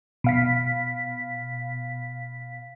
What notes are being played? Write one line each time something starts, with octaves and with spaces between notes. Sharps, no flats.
B2 F5 B6